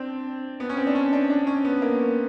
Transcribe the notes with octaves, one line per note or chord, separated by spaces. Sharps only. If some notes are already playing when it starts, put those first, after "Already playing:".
Already playing: C4 D4
B3
C#4
C4
D4
C#4
D4
D4
C#4
B3
A#3